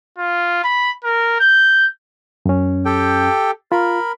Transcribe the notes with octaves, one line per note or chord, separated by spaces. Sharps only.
F4
B5
A#4
G6
F#2 C#4
G4 A4 G5
F4 A#4 B5